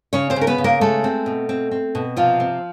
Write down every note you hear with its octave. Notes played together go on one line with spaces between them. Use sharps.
C#3 C#4 C#5
C4 C5
C#3
A#4
B3 B4
C#3
A#3 A#4
G#3 A3 A4
C4
B2
C4
C4
B2
C3 F3 F4
C4